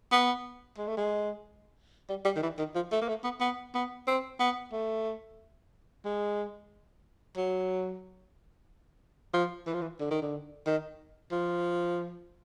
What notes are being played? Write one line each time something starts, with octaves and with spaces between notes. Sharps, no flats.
B3
G#3
A3
G#3
G3
G3
D#3
E3
D#3
F3
A3
A#3
A3
B3
B3
B3
C4
B3
A3
G#3
F#3
F3
E3
F3
E3
D3
D#3
D3
D#3
F3